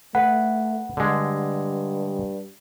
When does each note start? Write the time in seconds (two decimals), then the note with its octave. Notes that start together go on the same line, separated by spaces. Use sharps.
0.15 A3 B4 F#5
0.97 G2 D3 G#3